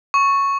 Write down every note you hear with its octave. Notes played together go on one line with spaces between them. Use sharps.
C#6